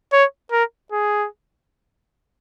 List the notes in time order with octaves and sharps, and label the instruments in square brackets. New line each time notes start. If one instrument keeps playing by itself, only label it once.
[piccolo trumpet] C#5
A#4
G#4